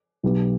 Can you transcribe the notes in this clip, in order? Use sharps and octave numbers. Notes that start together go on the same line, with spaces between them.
B1 B2 B3 G4